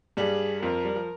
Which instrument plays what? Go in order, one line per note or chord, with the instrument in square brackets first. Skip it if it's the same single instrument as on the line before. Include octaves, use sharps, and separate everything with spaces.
[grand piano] G2 G3 [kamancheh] G#4
[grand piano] F2 F3 [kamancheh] A#4
[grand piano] G3
F3